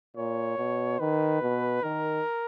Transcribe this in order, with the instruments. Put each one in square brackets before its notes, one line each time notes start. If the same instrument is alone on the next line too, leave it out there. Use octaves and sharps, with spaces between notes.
[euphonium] A#2 [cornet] C#5
[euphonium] B2
[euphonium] D#3 [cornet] B4
[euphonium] B2
[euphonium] D#3 [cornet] A#4